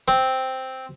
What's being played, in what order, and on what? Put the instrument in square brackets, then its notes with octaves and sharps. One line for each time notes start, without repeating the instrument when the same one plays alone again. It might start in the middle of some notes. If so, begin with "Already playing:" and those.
[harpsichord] C4